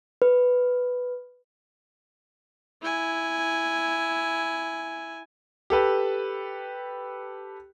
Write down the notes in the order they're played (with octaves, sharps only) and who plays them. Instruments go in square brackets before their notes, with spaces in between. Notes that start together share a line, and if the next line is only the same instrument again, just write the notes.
[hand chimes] B4
[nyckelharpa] E4 G#5
[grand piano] G4 A4 B4